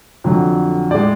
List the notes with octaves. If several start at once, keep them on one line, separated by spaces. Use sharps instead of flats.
F2 D3 F#3
A2 G#3 D5